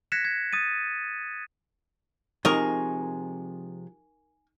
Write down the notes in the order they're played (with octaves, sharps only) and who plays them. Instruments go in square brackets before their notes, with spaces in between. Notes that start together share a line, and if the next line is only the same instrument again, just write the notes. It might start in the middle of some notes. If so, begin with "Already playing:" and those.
[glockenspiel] F#6 G#6 A#6 B6 C#7 E7
G#6
D#6 A6 D#7
[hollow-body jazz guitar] C3 F3 G#3 [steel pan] D#4 [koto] A#4 D#5 [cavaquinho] G#5 C#6